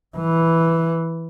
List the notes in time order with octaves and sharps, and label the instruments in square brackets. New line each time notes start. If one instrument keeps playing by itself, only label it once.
[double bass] E3